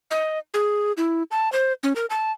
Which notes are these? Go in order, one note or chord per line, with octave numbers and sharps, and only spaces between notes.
D#5
G#4
E4
A5
C5
C#4
A#4
A5